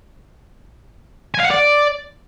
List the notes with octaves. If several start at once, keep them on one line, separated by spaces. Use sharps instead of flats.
G#5
F5
F#5
D5